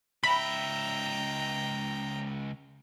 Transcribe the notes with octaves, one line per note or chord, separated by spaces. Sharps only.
C#2 E5 G5 A#5 B5